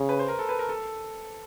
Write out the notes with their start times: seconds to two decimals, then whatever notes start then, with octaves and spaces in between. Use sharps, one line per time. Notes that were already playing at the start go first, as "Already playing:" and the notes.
Already playing: C#3
0.09 B4
0.19 C5
0.28 A#4
0.39 A4
0.49 B4
0.59 A#4
0.69 A4